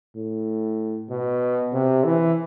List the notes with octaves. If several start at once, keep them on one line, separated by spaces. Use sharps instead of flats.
A2
B2
C3
E3